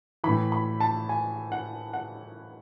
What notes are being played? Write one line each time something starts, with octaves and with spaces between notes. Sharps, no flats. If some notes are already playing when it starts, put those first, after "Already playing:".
A2 E3 B5
B5
A5
G#5
F#5
F#5